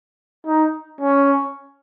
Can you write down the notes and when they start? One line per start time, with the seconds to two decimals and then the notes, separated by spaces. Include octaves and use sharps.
0.47 D#4
1.01 C#4